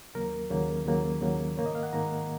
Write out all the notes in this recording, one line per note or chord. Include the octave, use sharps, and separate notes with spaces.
D#2 C#3 F#3 A#3 A#4
D#2 C#3 F#3 A#3
D#2 C#3 F#3 A#3
D#2 C#3 F#3 A#3
G#2 D#3 A#3 C#5
D#5
F5
F#5
G#2 D#3 A#3 A#5